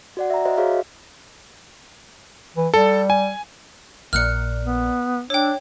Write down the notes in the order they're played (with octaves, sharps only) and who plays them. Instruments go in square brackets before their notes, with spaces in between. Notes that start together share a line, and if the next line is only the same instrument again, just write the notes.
[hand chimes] F#4 D5 F#5
E5 A#5
F#4 C5 D#5 E5
F#4 G#4 C#5 E5 F5
[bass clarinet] E3
[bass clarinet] G3 [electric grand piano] A4
[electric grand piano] G#5
[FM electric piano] A#1 A#2 D5 [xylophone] F6 F#6 C#7
[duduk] B3
[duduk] D4 [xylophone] C#5 G5 [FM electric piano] E6